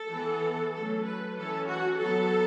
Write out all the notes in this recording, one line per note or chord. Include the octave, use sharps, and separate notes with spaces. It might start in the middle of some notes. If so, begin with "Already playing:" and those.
Already playing: A4
E3 B3
F#3 A3 C#4 A4
B4
E3 C#4 A4
F#4
F#3 B3 A4